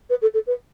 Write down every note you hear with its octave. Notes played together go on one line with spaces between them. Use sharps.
B4
A4
A4
B4